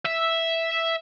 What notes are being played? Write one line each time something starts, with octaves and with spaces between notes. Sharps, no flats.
E5